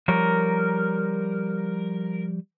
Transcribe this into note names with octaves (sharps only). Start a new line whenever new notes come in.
F3 G3 A#4 C#5